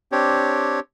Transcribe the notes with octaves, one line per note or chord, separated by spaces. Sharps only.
C4 D4 G4 C#5